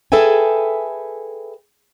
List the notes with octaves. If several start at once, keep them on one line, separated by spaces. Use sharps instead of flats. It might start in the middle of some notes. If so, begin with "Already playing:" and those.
G#4 A4 B4 E5 G5 G#5